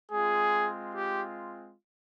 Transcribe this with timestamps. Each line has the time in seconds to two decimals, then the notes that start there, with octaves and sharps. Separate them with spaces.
0.11 G#3 C4 F4 G#4
0.94 G4